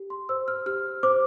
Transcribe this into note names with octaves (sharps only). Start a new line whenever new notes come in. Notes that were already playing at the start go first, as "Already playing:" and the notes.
Already playing: G4
C6
C5 E6
F6
G4 F6
C5 D6